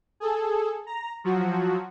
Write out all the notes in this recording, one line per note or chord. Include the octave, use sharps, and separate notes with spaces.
G#4 A4
A#5
F3 F#3 F#4